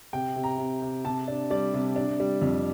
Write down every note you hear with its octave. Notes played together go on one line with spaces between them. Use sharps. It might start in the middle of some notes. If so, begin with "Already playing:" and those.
C3 G5
C3
A#5
C3
C3
C3 A5
D4
G3 D5
C3
D4
G3
F2